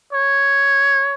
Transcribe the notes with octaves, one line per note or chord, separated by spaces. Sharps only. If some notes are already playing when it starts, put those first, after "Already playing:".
C#5